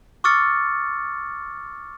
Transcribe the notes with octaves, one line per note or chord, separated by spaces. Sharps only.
C#6 D6 E6 F6 A6 C#7